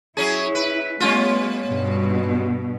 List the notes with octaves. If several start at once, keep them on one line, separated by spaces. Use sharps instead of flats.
F#3 C#4 E4 G#4
B4
G3 A3 B3 C#4 F4
G2 B2